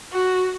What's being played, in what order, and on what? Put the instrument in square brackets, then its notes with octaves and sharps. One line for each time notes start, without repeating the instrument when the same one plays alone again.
[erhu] F#4